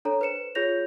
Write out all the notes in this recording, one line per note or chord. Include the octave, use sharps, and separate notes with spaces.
D4 A4 C#5 A#5
B4 C5 C#7 E7
F4 G#4 C#5 G6 A#6 F7